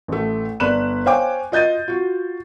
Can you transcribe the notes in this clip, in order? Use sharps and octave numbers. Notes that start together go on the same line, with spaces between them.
A1 A3
G1 D5 B5 F#6 E7
C5 C#5 F5 G5 G#5 D6
F4 D#5 G6 A6 D#7
F4 F#4